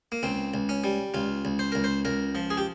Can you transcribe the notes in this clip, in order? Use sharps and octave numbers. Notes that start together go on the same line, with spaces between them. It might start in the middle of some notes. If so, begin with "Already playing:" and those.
A#3
C#2 C4
C#2
C#4
G3
C#2 F4
C#2
C5
C#2 A#4
C5
C#2 A#4
F3
G#4
G4